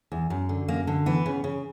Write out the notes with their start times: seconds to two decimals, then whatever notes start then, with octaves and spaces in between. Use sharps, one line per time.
0.12 E2
0.30 F#2
0.49 D3
0.68 F#2 A#3
0.87 D3
1.06 E3 B3
1.26 C#3
1.44 C#3